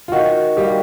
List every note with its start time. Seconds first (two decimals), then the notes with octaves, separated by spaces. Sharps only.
0.08 F4
0.12 D#3 F#4
0.57 G3 A#3 G4